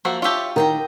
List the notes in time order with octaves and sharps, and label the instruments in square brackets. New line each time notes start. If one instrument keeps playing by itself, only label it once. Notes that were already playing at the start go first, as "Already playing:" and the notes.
[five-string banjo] F3 A#3 F#4 [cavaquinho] E5
[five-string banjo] F4 G4 [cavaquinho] C#5 E5 A5
[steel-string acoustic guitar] D#3 [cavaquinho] D#5 G5 A#5